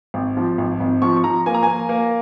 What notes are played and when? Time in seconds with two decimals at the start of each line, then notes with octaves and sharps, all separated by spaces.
0.14 G#1
0.37 F3
0.58 G#1
0.80 G#1
1.02 F3 C#6
1.16 C#6
1.24 F3 A#5
1.46 A#3 G#5
1.54 A#5
1.63 A#3 G#5
1.89 A#3